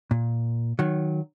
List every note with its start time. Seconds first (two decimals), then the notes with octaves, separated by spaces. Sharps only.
0.11 A#2
0.79 D#3 F#3